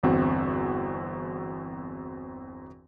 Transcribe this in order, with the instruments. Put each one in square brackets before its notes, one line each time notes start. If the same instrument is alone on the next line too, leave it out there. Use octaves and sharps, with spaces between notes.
[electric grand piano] G1 E2 C4 F#4